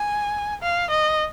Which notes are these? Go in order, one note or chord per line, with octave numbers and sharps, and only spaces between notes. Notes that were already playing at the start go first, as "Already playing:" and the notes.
Already playing: G#5
F5
D#5